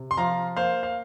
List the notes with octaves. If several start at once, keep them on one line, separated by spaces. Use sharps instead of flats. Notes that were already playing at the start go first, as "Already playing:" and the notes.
Already playing: C3
C6
F3 F5 A#5
A#3 C5 F5
F5